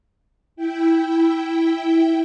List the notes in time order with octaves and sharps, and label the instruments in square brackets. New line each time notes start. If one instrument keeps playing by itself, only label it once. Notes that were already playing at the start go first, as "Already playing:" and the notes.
[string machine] E4 G5